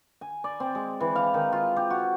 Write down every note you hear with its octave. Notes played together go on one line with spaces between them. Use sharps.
G#5
D5
C4
G#3
E3
F5
D#3
F4
G4
F#4